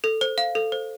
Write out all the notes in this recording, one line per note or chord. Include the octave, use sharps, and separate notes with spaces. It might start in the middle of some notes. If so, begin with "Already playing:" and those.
A4
C5
F5
A4
C5